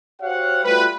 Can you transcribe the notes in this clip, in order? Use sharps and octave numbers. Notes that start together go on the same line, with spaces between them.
F#4 G4 C5 C#5 F5 F#5
G3 A3 F4 F#4 B4